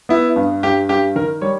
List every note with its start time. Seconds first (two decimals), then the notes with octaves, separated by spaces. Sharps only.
0.09 B3 E4
0.36 G2
0.63 G2 G4
0.89 G2 G4
1.16 D#3 A#4
1.42 G3 C#5